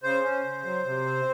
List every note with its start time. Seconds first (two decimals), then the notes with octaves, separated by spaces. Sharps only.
0.03 C#3 C5
0.23 C#4
0.44 C#3
0.64 F#3
0.85 C3
1.05 C4